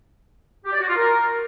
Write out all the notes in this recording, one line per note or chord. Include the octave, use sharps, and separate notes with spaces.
G4
D5
F#4
F4
A#4